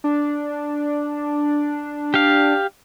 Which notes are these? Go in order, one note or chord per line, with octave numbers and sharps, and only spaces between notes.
D4
G4 F5